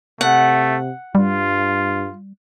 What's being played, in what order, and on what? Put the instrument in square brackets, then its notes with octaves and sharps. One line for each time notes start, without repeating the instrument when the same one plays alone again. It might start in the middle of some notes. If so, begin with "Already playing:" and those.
[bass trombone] C3 [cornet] A3 [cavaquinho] F#5
[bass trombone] G2 [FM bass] G3 [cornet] F4